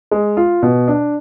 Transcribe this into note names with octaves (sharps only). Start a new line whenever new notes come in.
G#3
F4
B2
D4